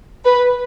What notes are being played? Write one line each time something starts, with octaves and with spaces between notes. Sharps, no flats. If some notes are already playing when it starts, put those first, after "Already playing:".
B4